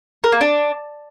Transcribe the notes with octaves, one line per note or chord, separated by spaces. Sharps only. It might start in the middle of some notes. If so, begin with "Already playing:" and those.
A#4
A#3
D4